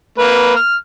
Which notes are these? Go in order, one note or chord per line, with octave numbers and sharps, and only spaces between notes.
A#3 B4
F6